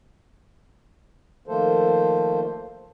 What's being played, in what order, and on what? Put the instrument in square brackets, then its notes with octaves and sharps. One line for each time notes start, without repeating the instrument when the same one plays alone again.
[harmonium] D#3 F3 A3 A#3 A4 C5